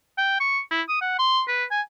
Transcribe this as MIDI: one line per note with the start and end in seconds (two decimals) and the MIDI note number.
0.18 0.38 79
0.40 0.60 85
0.71 0.82 64
0.89 0.98 87
1.01 1.17 78
1.19 1.42 84
1.48 1.64 71
1.71 1.81 80